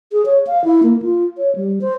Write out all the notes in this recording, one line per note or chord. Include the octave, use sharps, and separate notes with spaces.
G#4
C#5
F5
E4
A#3
F4
C#5
G3
C5